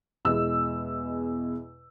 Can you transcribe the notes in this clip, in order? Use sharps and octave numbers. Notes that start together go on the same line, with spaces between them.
E2 B2 G#3 E6